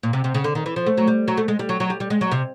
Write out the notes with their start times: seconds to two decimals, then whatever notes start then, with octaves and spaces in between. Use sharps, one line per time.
0.03 A#2
0.13 C3
0.24 C3
0.35 C#3
0.44 D3
0.55 D#3
0.66 E3
0.76 F3
0.86 A3
0.98 F#3
1.08 G3
1.28 F#3
1.37 A3
1.48 G#3
1.59 G3
1.69 F#3
1.80 F#3
1.90 G3
2.00 G3
2.10 G#3
2.21 F#3
2.32 C3